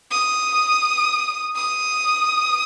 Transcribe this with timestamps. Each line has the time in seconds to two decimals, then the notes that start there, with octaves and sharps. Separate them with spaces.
0.11 D#6
1.55 D#6